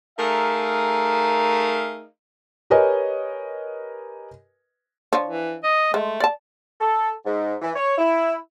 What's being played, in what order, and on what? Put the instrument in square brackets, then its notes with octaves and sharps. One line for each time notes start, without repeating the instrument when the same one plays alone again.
[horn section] A3 D#4 G#4 A#4 E5 F5
[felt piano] G4 A#4 B4 C#5 D#5 G#5
[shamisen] F3 D4 C#5
[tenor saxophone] E3
D#5
[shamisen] G#3 [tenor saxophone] A3
[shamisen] D5 A5
[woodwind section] A4
G#2
E3
C#5
E4